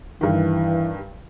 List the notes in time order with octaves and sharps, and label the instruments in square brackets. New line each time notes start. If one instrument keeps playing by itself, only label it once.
[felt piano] G2 D#3 [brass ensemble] E3